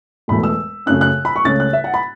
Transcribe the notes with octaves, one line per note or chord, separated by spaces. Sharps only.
E1 E2 B2 A3 B5
E6
F#2 C#3 A3 C#4 F#6
F#6
B5
C#6
C#2 C#3 A3 C#4 A6
F#6
E5
F#5
B5